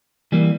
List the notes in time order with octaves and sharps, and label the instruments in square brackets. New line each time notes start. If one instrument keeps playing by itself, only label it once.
[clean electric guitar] E3 G3 A#3